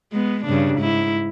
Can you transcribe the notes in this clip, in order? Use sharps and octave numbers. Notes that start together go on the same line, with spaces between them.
G#3 B3
G2 C#3 D4
G#2 E4